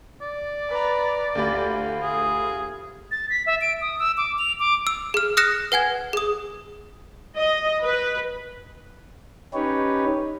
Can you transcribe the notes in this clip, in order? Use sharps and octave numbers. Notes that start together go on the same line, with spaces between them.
D5
B4 A#5
D2 F4 G4 B5
G#4
A6
B6
E5
D7
D#6
E6
D6
F7
D6
E6
G#4 F6
D#6 F6 F#6 A#6 C#7 E7
B4 F#5 G#5 G#6
G#4 D#6
D#5
B4
C#4 D#4 G4 B4 C#5